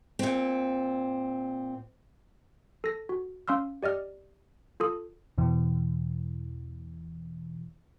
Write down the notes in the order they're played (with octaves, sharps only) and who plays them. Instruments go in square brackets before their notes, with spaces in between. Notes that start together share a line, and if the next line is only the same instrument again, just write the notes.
[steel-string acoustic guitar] A#2 C4
[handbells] A4 A#6
F#4
C#4 F5 C6 E6 F6
G4 D5 D#5 F6
F4 A4 D#6
[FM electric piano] E2 B2 E3